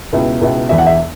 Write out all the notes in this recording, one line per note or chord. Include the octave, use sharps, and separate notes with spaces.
C#2 B2 B3 E4
C#2 B2 B3 E4
E1 E2 E3 E5
F#5
E5